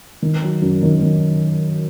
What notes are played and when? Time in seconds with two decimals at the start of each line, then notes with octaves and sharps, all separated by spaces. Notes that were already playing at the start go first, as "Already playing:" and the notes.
0.22 D#3
0.42 F#3
0.62 F#2
0.83 D#3
1.03 D#3